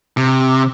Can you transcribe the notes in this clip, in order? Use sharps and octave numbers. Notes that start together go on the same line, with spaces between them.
C3